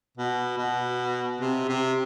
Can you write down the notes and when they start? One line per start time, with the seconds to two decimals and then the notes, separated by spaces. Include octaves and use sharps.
0.17 B2
0.58 B2
1.40 C3
1.68 C3